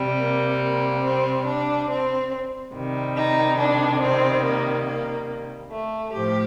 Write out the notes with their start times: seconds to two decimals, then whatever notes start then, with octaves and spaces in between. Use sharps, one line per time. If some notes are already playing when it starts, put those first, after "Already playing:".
Already playing: C3 G3
0.18 A#3
0.61 A#3
1.04 C4
1.46 D4
1.89 C4
2.73 C3 D#3 G3
3.15 D#4
3.58 D4
4.01 C4
4.43 A#3
4.86 A#3
5.71 A3
6.13 A2 F3 G4